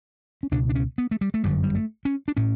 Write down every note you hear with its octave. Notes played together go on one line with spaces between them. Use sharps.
C#4
C#2 B2 D4
D4
C#4
B3
A3
G3
A3
G1 F#2 D3 G3
G3
A3
C#4
D4
A2 C#4